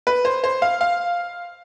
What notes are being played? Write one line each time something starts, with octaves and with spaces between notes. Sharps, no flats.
B4
C5
C5
F5
F5